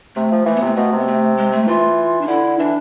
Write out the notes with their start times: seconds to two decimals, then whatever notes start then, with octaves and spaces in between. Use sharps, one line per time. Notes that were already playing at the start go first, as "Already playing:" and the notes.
0.15 C3 A3
0.32 F3
0.46 E3 A3
0.56 B3
0.62 C3 A3
0.76 B2 A3
0.92 C3
0.99 B3
1.07 A3
1.37 G#3
1.52 A3
1.67 E3 F4
2.21 D4
2.28 D3 E4
2.59 E3 D4